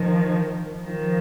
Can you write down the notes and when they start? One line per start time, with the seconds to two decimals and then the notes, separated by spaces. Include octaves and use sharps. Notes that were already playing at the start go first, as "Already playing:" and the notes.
Already playing: D#3 F3
0.86 D#3 F3